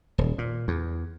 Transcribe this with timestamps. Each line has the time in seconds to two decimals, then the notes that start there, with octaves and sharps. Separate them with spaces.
0.18 D#1
0.38 A#2
0.68 E2